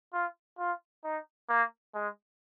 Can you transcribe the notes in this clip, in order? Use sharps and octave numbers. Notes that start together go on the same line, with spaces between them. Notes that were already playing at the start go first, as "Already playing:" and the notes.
F4
F4
D#4
A#3
G#3